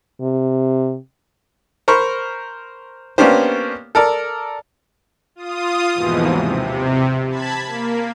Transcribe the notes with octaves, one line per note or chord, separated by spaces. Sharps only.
C3
A#4 C5 B5 C#6
A#3 B3 C#4 D4 G4 C5
A4 A#4 D5
F4 D#6
D#2 G#2 B2 E3 F3
C3
A5 B5 G#6 B6
A#3